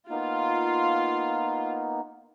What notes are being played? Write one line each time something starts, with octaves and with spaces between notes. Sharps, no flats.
A#3 B3 D#4 F4